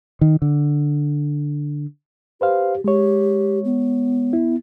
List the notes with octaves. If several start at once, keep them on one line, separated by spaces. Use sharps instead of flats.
D#3
D3
G4 B4 C5 F5
G#3 G4 C#5
B3
E4